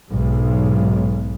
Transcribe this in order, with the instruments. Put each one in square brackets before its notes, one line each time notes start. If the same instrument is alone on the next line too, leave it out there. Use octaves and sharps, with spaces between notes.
[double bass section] B1 G#2